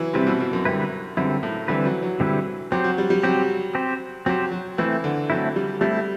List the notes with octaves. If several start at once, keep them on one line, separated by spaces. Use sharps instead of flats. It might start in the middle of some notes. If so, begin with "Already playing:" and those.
Already playing: E3 F#3
C3 G3 C4 E4 B4
B2
B2
F#2
D3 G3 C4 E4 B4
F#2 D3 G3 C4 E4 B4
A2
D3 E3 G3 C4 E4 B4
F#3
F#3
D3 G3 C4 E4 B4
F#3 C4 G4 C5
F#3
G3
G3
F#3 C4 G4 C5
C4 G4 C5
F#3 C4 G4 C5
F#3
E3 A3 C4 E4
D3
F#3 A3 C4 E4
G3
G3 A3 C4 E4